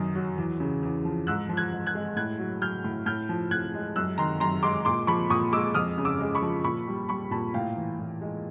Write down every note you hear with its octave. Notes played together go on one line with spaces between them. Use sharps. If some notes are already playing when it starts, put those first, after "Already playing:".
Already playing: F#2 D#3 D#6
F#3
E2
C#3
E2
F3
G#2 E6 F#6
F3
F#6 G#6
G#2
F#6 G#6
G#3
A2 F#6 G#6
F#3
F#3 F6 G6
A2
A2 F6 G6
F3
A2 F#6 G#6
G#3
F#2 E6 F#6
D#3 A#5 C6
F#2 A#5 C6
G#3 C6 D6
A#2 C6 D6
F3 B5 C#6
A#2 C#6 D#6
G#3 D6 E6
F2 D#6 F6
C#3
D6 E6
G#3
B5 C#6
F3
A#2 B5 C#6
G3
G3 B5 C#6
A#2 A5 B5
A2 F5 G5
E3
A2
G#3